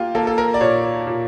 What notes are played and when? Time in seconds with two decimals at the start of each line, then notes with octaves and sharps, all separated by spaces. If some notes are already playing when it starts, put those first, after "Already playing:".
Already playing: A#3 F4 G4
0.15 A#3 A4
0.27 A4
0.38 A#4
0.54 D5
0.61 A#2 C#5
1.07 A#2